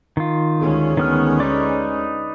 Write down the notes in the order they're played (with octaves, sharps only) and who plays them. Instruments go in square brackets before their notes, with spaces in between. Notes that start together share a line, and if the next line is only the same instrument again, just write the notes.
[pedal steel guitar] D#3 F4
[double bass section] D2 G#3 C#4
[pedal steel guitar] D#3 B3 F6
D#4 B4 D5